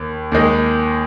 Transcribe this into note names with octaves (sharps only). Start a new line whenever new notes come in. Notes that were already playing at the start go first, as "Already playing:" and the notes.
Already playing: D#2
D#2 D#3 G#3